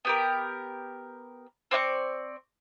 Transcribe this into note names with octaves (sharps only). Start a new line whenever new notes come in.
B3 G4 A#4
C4 D5 F5 C#6